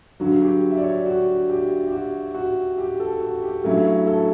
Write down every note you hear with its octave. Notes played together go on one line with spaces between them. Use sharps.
G2 D3 F#3 F#4
G4
E5
D5
C#5
F#4
G4
G4
F#4
F#4
G4
A4
F#4
G4
G2 F#3 A3 C#4 E4 A4
A4